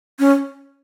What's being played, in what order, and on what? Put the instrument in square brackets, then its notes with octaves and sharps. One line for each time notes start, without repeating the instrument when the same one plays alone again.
[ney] C#4